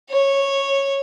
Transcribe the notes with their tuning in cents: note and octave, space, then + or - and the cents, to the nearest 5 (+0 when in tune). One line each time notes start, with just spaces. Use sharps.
C#5 -10